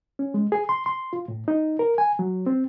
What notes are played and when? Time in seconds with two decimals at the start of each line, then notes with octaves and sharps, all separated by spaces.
0.19 C#4
0.34 G#3
0.52 G#4
0.69 C6
0.86 C6
1.13 F4
1.28 A2
1.48 D#4
1.79 A#4
1.98 G#5
2.19 F#3
2.46 C4